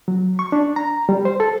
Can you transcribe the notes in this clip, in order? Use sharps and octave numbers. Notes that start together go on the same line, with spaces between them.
F#3
C#6
D4
A#5
G3
C5
A4